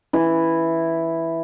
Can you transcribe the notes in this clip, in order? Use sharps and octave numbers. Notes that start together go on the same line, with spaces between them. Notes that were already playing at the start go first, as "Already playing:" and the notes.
E3 E4